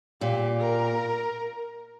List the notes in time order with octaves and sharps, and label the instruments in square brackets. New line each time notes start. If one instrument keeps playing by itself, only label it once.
[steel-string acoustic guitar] A#2 [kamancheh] G4
[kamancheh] A#4